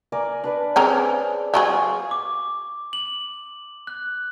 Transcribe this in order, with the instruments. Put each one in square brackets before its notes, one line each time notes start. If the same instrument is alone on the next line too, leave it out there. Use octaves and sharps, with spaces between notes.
[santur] A#4 D5 G#5
D4 B4 D5
[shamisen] C4 C#4 A#4 [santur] G#4 D5 G#5
[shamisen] F#3 F4 G#4 [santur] F5 C#6
[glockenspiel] D6
F#7
F#6